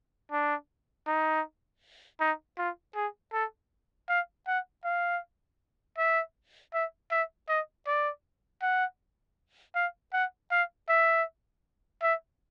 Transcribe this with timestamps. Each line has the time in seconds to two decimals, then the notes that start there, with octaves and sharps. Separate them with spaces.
0.32 D4
1.07 D#4
2.20 D#4
2.58 F4
2.95 G#4
3.33 A4
4.09 F5
4.47 F#5
4.84 F5
5.98 E5
6.74 E5
7.11 E5
7.49 D#5
7.87 D5
8.62 F#5
9.75 F5
10.13 F#5
10.51 F5
10.89 E5
12.02 E5